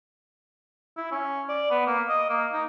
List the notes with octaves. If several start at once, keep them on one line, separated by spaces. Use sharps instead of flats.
E4
C#4
D5
B3
A#3
D#5
A#3
D#4